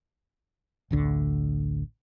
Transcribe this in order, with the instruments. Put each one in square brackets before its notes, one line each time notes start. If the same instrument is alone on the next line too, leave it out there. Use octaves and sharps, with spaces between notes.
[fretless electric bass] A1 D2 D3